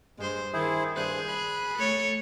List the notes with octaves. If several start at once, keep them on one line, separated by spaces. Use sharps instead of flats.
G2 G#3 C5
D#3 E4 G#4 C5
G2 G#4 C5 F#6
B5 F#6
A3 A4 C#5